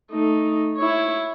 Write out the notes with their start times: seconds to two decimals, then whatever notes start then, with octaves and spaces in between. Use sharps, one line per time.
0.11 A3 D#4
0.78 E4 C#5